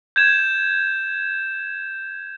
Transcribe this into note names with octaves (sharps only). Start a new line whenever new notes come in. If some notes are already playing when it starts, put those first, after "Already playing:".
G6 G#6 E7